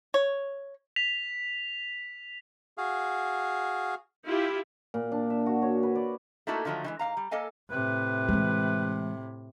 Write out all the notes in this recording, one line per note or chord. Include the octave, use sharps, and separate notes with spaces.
C#5
B6 F7
F#4 G#4 F5
E4 F4 G4
A#2
D4
E5
F#4
C#5
B4
D5
A3 A#3 D#4 E4 F#4 A4
D3 D#3 F3 F#3 A3
D#3 E3 G#3
G#2 A#3 F5 A#5
G3
A#3 A4 D#5 F5 G#5
A2 C3 B4
E3 G#3